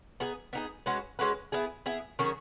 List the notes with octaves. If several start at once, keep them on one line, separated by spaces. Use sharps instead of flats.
B3 D#4 G#4
B3 D#4 G#4
G#3 C#4 F#4 B4
G#3 C#4 F#4 B4
B3 E4 G#4
B3 E4 G#4
D#3 F#3 C#4 G#4